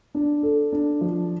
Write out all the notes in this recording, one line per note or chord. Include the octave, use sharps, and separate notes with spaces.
D4
A4
D4
F3